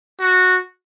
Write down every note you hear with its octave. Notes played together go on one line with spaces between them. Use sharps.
F#4